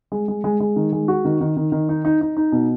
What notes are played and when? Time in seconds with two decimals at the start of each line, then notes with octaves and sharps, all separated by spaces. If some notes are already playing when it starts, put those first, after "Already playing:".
0.12 G#3
0.28 G#3
0.44 G#3
0.60 G#3
0.76 D#3
0.93 G#3
1.08 F#4
1.25 D#3
1.41 D#3
1.57 D#3
1.72 D#3
1.89 D#4
2.05 D#4
2.21 D#4
2.37 D#4
2.52 B2